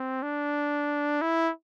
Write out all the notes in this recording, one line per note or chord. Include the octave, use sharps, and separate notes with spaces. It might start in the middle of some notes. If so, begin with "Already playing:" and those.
Already playing: C4
D4
E4